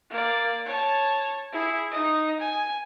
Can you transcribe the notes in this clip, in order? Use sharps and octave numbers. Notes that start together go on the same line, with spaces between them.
A#3 D5
C#5 A5
E4 G#4
D#4 D#5
G#5